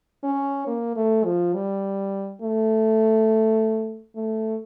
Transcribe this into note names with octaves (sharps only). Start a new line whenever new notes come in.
C#4
A#3
A3
F3
G3
A3
A3